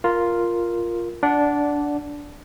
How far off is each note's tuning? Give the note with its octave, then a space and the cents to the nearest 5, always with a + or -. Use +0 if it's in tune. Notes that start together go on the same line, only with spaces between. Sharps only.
F4 +0 A#4 +0
D4 -10 D5 +0 F#5 +0